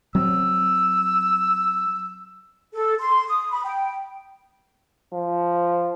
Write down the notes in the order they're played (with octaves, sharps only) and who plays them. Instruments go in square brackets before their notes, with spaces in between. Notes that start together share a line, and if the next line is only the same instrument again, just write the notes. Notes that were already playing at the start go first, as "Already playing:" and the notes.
[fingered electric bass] F#3 C4 [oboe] E6
[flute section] A4
C6
D#6
B5
G5
[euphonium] F3